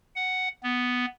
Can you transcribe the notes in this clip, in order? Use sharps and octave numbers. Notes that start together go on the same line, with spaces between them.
F#5
B3